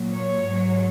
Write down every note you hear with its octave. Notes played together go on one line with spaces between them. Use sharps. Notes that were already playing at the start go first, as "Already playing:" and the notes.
Already playing: A#2 F#3
C#5
G#2 F#3